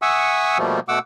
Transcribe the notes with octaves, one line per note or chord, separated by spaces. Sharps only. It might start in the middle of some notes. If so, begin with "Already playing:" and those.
E5 F#5 G#5 C#6 D#6 E6
B2 F3 G3 A3 A#3
B2 A3 F#5 D6 E6